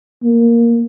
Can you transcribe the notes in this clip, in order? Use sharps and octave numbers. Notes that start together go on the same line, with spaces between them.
A#3